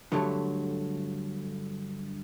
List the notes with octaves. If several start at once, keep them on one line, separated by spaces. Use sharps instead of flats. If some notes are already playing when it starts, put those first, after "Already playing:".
G2 D3 F#3 A3